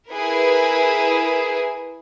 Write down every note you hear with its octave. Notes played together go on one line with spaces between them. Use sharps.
E4 G#4 A#4 B4